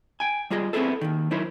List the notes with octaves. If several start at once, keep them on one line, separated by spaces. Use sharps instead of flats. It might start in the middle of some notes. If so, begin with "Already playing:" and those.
G5 G#5
G3 F4 G#4 D#5
B3 C4 D#4 E4 G#4 A4
D#2 B2 D#3
F#3 D#4 E4 A#4 C5